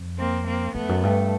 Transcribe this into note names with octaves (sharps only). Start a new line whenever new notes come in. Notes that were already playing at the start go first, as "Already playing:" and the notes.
Already playing: F2
A#3 C4
A#3 C4
F2 A3 B3
F#2
G2 A3